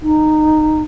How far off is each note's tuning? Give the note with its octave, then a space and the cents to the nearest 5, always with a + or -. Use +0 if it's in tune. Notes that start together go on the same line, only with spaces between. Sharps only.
D#4 -15